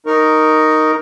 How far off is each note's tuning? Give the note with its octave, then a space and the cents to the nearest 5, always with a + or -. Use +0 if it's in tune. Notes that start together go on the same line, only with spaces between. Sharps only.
D#4 +0 A#4 +0 C#6 +0